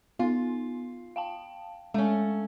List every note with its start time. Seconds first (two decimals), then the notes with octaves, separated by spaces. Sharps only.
0.19 B3 D#4 F4
1.16 F5 G5 A5
1.94 G#3 A3 C#4